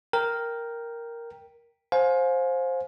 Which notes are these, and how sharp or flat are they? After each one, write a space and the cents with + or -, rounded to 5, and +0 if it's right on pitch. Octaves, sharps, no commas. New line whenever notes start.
A#4 +0 G5 +0
C5 +10 F5 +30 G#5 +20